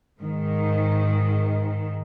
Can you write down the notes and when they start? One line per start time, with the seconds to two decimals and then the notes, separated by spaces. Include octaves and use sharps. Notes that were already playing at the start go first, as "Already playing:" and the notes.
0.21 G#2 D#3